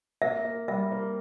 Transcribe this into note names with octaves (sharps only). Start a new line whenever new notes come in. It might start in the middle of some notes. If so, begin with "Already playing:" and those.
A#3 E5
A#3
G3 E5
A#3